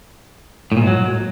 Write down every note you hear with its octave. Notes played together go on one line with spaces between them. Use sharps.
A2
A#2
G#2
F#3